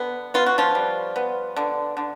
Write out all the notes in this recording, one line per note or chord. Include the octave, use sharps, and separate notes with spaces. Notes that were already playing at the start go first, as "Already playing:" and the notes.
Already playing: D3 B3
B3 F4
F#4
F3 F4
G3
B3
D3
D3